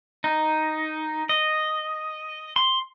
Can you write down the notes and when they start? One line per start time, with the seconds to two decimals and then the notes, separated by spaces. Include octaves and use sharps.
0.24 D#4
1.29 D#5
2.56 C6